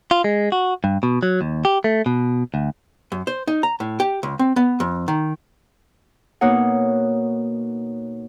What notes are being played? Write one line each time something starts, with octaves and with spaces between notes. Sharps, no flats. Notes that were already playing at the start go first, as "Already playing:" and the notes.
F4
G#3
F#4
G2
B2
F#3
D#2
G4
A3
B2
D2
F#2
C5
D#4
A#5
A2
G4
C#2
C4
B3
F2
D#3
B2 A#3 D#4 C#5 F#5